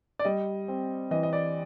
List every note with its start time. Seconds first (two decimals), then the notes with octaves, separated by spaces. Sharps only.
0.19 D5
0.25 G3 D#5
0.68 C4
1.11 E3 D#5
1.23 D#5
1.33 D5